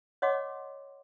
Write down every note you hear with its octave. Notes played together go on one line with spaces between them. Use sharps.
C#5 D#5 F#5 C6 D6